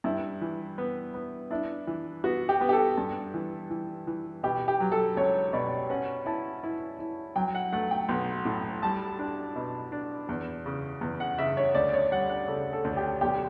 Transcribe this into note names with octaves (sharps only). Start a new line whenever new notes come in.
G2 E4
E3
B3
B3
D4 E4
E3
B3 F#4
G4
B3
G4
A4
G2
E3
E3
E3
B2 G4
G4
F#3
A4
C#2 C#5
B2 D5
C#4 F#5
E4 A5
E4
E4
F#3 G5
F#5
A3 F#5
G5
B1
A2
G3 A5
D4
B2
D4
E2
C#3
E2
F#5
C#3 E5
C#5
D2 D5
C#5
G3 F#5
F#5
C#3 A4
A4
D2
G4
B1 G4